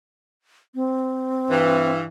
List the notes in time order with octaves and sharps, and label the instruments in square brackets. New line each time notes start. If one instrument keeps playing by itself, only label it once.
[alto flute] C4
[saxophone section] G2 E3